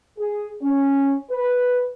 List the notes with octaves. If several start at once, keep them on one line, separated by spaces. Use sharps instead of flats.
G#4
C#4
B4